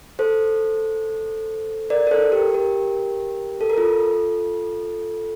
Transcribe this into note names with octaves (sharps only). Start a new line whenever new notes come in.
A4 C5
A#4 D5
A#4
A4 C5
G4 A#4
G4 A#4
A4
A#4
F4 A4